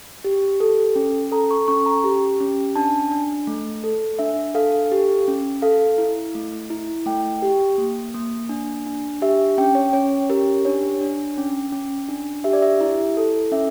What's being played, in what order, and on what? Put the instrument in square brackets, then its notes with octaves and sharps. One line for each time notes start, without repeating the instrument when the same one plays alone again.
[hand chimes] G4
A4
C#4
A4 A#5
C#6
C#4 C#6
A#5
G4
C#4
D4 A5
D4
A3
A4
D4 E5
A4 F5
G4
C#4
A4 F5
E4
A3
E4
A3 G5
G4
A#3
A#3
D4
D4
G4 E5
C#4 G5
C#5
C#4 C#5
G4 A#4
D4 C#5
D4
C#4
C#4
D4
G4 E5
D5
E5
E4 E5
A4
C#4 E5